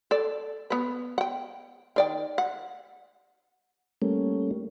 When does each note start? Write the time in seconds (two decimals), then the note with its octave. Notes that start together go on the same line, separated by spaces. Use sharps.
0.11 A4 D5
0.70 B3 B4
1.18 F#5 G5
1.96 D#3 D5 G5
2.38 F#5
4.02 G3 A3 A#3 C#4